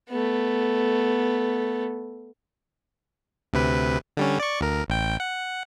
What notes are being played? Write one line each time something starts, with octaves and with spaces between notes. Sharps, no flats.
A3 B3
D2 C3 B4
D3 G3 C#4
D5 C#6
D2 A#4
A1 G5
F#5